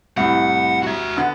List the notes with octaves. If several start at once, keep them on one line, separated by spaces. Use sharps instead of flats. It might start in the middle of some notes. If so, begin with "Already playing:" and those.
C2 A2 F#5
F#4 E5
D3 B3